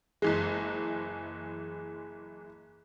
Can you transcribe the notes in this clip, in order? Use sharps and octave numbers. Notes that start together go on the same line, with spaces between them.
F#1 E3 G#3